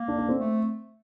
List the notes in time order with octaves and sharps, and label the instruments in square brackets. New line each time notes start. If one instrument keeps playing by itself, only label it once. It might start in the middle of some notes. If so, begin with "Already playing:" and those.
Already playing: [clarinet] A#3
[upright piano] D4
D4
C4
[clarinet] A3